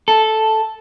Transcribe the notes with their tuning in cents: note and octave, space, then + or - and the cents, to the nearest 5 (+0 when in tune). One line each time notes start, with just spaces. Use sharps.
A4 -5